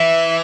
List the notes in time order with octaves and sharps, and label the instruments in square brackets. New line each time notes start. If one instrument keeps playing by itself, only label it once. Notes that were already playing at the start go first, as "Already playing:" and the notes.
Already playing: [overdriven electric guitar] E3 [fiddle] E5